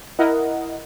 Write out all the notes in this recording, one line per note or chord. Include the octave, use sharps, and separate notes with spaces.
E4 A#4 D#5 F#5